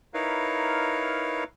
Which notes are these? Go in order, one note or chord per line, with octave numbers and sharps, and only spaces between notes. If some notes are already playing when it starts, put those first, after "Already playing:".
D#4 E4 A#4 B4 C#5 F5